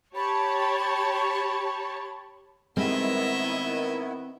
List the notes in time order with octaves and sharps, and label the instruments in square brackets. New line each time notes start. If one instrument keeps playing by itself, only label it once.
[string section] G4 C#5 A5 [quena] B5
[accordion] D#3 B3 E4 [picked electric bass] G3 G#3 [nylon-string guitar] C4 [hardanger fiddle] D#5 E5